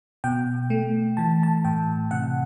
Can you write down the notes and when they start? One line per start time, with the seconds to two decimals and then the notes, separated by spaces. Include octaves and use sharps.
0.24 B2 G5
0.70 A3
1.17 E3 A5
1.43 A5
1.65 A2 G5
2.11 C3 F#5